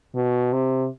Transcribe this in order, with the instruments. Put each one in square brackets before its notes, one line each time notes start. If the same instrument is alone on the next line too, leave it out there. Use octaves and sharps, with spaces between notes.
[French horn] B2
C3